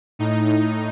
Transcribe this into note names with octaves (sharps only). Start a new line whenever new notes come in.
A2 D#4